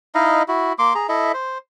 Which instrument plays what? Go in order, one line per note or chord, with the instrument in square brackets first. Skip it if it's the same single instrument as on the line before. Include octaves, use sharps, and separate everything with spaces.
[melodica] D#4 E4 D#5 F5
E4 F#4
A#3 C6 D6
G#4 A#5
E4 A4 D#5 E5
C5